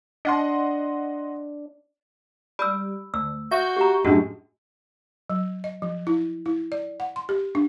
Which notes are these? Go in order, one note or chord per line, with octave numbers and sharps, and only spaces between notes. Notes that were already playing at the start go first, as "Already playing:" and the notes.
D4 D#5 F#5 C6
G3 B5 E6
D2 E6
F#4 E5 G6
G4 A#5
F#2 A2 G#3 D4 F#4
F#3
D#5
F3
E4
E4
D5
F#5
C6
G4
D4